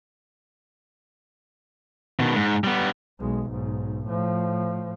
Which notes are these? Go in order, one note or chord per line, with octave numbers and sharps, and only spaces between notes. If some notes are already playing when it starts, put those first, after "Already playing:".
B2 D#3
G#2
G3 B3
B1 G#3
B1 G#2
A2 F3